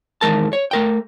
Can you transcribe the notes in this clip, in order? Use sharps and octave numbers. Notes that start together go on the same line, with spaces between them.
E2 D#3 G#3 A#4 A5
C#5
A3 A#4 G5